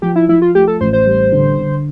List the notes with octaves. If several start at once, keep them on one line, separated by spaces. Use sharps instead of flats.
F3 G4
E4
F3 E4
F4
A3 G4
A4
A1 C5
C5
G3
D3
D3